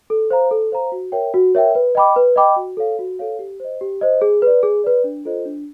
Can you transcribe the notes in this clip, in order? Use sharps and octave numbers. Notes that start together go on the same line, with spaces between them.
A4
C5 F5 A#5
A4
C5 F5 A#5
F#4
A#4 C#5 E5 G5
F#4
A#4 C#5 E5 G5
B4
D#5 G5 B5 D6
B4
D#5 G5 B5 D6
F#4
A4 C#5 F5
F#4
A4 C#5 F5
G4
C5 D#5
G4
C5 D#5
G#4
B4 D5
G#4
B4 D5
D4
F4 A4 C5 D#5
D4